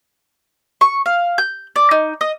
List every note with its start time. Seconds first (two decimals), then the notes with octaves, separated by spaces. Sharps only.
0.81 C#6
1.06 F5
1.38 G6
1.76 D5
1.91 D#4
2.21 D#5